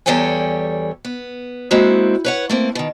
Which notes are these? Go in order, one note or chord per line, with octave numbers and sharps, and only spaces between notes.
E2 G3 A4 C#5 G5 G#5
B3
G#3 A#3 C4 E4 F#4
B4 C#5 F#5
A3 A#3 C4
B2 D#3